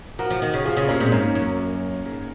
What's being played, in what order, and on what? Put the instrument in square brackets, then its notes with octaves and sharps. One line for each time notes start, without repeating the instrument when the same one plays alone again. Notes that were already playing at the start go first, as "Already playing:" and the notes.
[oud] F3 [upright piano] F#4 A#4
[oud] F3
D#3
C#3
[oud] F3 [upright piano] F4 G#4
[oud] C#3 [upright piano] F4 G#4
[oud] C3 [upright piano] A#3 C#4
[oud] A#2 [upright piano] G#3 C4
[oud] G#2 [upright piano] A#3 C#4
[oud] F#2
G#2